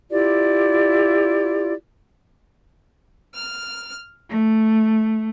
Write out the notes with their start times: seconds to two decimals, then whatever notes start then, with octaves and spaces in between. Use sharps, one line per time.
0.11 E4 F4 G4 D5
3.34 F6
4.29 A3